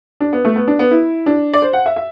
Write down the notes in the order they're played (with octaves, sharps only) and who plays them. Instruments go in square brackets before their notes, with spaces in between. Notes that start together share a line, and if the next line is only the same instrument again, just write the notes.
[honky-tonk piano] D4
B3
A3
B3
D4
B3
E4
D4
D5
C5
F#5
E5
E5